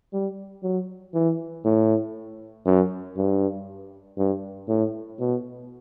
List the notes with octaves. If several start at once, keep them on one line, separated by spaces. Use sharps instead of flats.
G3
F#3
E3
A2
F#2
G2
G2
A2
B2